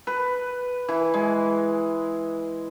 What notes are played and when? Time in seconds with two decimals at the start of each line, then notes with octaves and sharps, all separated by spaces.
0.07 B4
0.89 E3
1.14 G#3